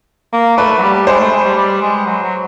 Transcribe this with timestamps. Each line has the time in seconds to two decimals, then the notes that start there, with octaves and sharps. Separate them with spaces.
0.33 A#3
0.57 A3 B4
0.78 F#3
0.82 G3
1.07 G#3 C5
1.19 A3
1.32 G#3
1.44 G3
1.56 G3
1.82 G#3
2.06 F#3
2.23 F#3